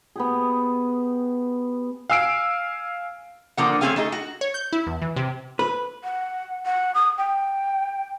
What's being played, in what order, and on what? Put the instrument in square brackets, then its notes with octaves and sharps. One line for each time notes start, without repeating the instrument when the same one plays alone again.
[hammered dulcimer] B3 G4 G#4
[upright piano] F5 G#5 E6 C7 D7
[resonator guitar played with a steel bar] D3 F3 A#3 F#5
A3 C4 C#4 G#4 F5 G#5
A3 D#4 G#4
F#4
[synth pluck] C#5
G6
E4
E2
E3
C3
[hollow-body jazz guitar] B4
[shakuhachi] F#5
F#5
D#6
G5